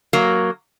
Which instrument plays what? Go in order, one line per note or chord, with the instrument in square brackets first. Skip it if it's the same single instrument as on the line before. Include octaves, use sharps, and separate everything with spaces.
[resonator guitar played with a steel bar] F#3 A#3